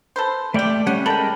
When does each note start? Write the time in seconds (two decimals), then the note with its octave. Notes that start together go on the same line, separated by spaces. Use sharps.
0.16 A4 B4 C5
0.54 G3 A3 G4 D5 G5
0.86 G3 C#4 F#5 G#5
1.06 G#3 A4 A#4 G5 B5